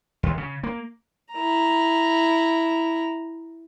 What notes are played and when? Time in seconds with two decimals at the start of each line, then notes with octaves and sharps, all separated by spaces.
0.23 D#2
0.38 C#3
0.63 A#3
1.33 E4 A#5